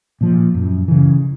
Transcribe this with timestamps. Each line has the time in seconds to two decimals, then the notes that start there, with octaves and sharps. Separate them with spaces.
0.21 A#2 F3
0.54 F#2
0.88 C#3 E3